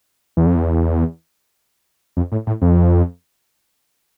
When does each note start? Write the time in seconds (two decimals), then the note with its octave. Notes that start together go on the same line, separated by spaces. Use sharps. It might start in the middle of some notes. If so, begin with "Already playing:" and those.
0.37 E2
0.46 F2
0.56 E2
2.17 F2
2.32 A2
2.47 A2
2.62 F2